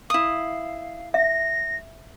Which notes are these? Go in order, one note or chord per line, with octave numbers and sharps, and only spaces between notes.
E4 F5 D#6
E5 A#6